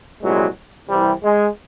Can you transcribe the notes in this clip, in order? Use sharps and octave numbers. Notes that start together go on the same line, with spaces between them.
C2 A#2 F#3 G#3
C2 C3 E3 G3
G#3